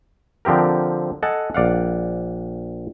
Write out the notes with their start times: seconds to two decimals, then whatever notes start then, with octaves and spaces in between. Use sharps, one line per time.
0.45 D3 F3 C4 G4 A#4
1.23 A4 D#5 F#5 G#5 A5
1.54 A#1 D5 F5 F#5